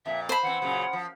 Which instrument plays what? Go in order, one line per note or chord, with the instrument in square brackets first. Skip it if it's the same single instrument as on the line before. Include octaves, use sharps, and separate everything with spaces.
[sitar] F2 A#2 [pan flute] E5
[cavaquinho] C5 B5 [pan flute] A5
[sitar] E3 C4 [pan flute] F#5
[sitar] A#2 C#3 F#3
F3